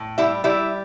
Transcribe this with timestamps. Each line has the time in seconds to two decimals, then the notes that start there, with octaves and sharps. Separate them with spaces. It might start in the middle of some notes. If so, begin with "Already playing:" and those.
Already playing: A2
0.18 G3 E4 E5
0.44 G3 E4 E5